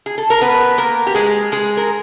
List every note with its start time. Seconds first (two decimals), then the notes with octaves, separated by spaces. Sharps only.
0.06 G#4
0.18 A4
0.30 A#4
0.41 B3 B4
0.78 A#3 A#4
1.07 G4
1.15 G#3 G#4
1.52 G#3 G#4
1.77 A#4